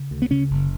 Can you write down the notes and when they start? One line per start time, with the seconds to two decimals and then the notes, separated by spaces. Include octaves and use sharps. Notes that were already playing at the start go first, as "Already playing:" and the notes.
Already playing: C#3
0.11 D2
0.22 B3
0.31 C#3 C#4
0.51 F#1